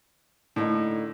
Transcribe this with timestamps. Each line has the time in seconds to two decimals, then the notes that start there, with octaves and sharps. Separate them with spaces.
0.56 A2 D3 A#3 D#4